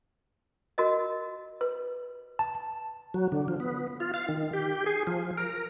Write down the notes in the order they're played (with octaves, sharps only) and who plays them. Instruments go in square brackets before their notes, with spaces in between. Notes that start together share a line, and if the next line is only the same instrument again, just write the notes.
[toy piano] F#4 A#4 D#5
B4
[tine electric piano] A5
[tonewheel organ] F#3
D3
F3
B3
F4
F5
D#3
G4
G#4
F3
A#4